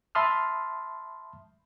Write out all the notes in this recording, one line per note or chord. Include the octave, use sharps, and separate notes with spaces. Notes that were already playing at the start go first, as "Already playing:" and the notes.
E5 A5 B5 C6 D#6 F6